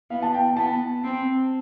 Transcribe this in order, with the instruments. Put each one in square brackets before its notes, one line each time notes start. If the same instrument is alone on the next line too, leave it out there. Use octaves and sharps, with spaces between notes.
[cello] B3 [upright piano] F5
[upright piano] A5
G5
[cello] B3 [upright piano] A5
[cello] C4